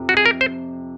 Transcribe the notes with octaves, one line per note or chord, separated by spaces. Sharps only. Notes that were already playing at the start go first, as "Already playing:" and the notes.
Already playing: F2 C3
F#4
G#4
A#4
C5